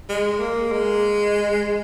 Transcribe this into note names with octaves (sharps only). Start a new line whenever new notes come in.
G#3
A#3
G#3